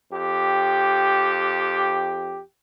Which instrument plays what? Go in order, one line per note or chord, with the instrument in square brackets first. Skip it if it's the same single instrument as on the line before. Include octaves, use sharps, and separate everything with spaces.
[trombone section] F2 G4